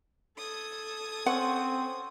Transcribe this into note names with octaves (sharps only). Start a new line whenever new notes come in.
A4 D#6 G#6
C4 C#4 F#5 C6 C#6